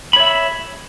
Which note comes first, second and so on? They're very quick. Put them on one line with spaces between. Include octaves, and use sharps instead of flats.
B5 C#5 E5